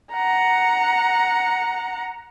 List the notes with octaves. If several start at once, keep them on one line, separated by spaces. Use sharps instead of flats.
F#5 A#5